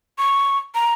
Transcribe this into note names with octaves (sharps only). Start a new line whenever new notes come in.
C#6
A#5